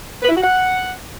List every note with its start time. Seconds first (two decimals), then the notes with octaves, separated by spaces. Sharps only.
0.22 B4
0.28 E4
0.35 F#4
0.42 F#5